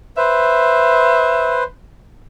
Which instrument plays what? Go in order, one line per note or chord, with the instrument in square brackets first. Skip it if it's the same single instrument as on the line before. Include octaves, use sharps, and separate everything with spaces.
[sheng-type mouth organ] B4 C5 [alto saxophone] E5